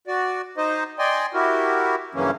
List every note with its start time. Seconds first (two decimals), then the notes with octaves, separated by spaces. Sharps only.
0.07 F#4 D5
0.58 D#4 C5 D#5
0.99 D5 D#5 G5 G#5 C6
1.34 E4 F#4 G4 A#4
2.15 G2 C#3 E3 F#3 A#3 C#4